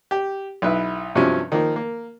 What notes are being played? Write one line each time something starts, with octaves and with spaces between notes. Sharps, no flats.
G4
B1 E4 B4
G2 C3 F3 F#3 C#4
D#3 F3 A#3
A#3